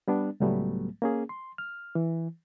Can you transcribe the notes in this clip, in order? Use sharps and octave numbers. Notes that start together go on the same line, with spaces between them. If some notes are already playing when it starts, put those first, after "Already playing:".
G3 B3 D4
C#2 A2 F#3 G3 A3 B3
A#3 C#4 G#4
C6
F6
E3